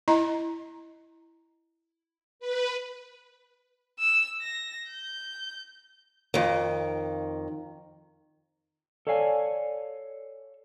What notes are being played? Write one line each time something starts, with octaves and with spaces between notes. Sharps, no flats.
E4 D#5 A#5
B4
E6
A#6
G6
F2 D#3
A4 C#5 D5 F5 G#5